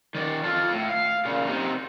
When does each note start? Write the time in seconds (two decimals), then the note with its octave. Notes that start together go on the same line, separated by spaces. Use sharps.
0.15 D#3 D5
0.44 F4 A4
0.72 A2
0.90 F5
1.25 A#2 C#3
1.47 C3 D#4